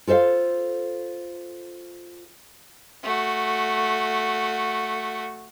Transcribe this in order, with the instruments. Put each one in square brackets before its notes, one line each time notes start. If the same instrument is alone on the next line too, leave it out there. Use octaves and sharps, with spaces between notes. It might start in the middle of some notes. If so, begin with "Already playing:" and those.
[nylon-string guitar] F4 A4 C5 E5 F5
[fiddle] A3 F#4